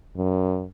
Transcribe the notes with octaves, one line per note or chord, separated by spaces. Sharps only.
F#2